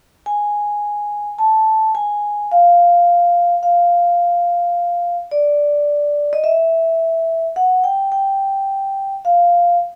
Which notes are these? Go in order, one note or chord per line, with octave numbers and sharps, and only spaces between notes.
G#5
A5
G#5
F5
F5
D5
D#5
E5
F#5
G5
G5
F5